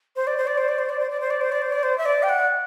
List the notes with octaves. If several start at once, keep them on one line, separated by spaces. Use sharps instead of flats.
C5
D5
C5
D5
C5
D5
C5
D5
C5
D5
C5
D5
C5
D5
C5
D5
C5
E5
D5
G5
F#5